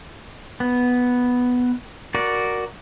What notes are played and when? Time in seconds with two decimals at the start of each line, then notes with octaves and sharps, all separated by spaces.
0.60 B3
2.15 F#4 A#4 D5